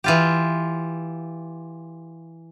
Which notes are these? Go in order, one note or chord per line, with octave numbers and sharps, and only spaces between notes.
E3 F4 G4